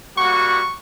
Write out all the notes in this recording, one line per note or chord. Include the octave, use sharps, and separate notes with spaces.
G3 A#3 F#4 C#6